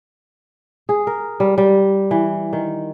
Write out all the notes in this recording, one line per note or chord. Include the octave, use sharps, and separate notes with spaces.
G#4
A#4
G3
G3
E3
D#3